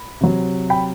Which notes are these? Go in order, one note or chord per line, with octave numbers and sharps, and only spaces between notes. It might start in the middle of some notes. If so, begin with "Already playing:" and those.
Already playing: B5
C3 F#3
G5 B5